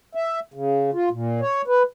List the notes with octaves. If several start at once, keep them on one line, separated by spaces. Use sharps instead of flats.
E5
C#3
F4
A#2
C#5
B4